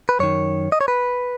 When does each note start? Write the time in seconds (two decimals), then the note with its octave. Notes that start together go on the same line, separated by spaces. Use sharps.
0.09 B4
0.20 F#2 D#3 C#5
0.72 D#5
0.81 C#5
0.88 B4